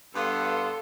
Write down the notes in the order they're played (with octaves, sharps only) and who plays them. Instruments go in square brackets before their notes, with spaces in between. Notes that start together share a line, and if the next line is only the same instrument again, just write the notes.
[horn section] G2 B3 [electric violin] A4 [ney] F5 [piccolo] C6